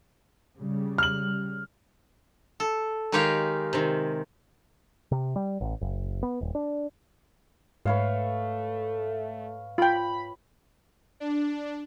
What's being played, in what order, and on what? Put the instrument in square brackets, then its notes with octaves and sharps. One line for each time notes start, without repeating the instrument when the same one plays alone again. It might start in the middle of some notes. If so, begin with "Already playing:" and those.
[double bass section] C#3 G3
[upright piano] F6 F#7
[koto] A4
D#3 G#3 D#4 G4 C#5 F5
C3 D#3
[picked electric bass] C3
G3
A1
F#1
B3
D#1
D4
[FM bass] G#2 [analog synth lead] A3 [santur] B4 C#5 F5
[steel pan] F4 G5 [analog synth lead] B5
[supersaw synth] D4